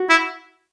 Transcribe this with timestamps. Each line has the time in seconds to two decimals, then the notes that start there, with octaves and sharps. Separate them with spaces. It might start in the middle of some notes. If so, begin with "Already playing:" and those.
Already playing: F#4
0.10 E4